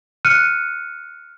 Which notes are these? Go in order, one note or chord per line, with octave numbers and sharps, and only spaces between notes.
F6 F#6 C#7 D#7